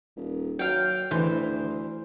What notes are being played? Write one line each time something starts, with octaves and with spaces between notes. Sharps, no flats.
D#1
F#3 F5 G5
D2 E3 C5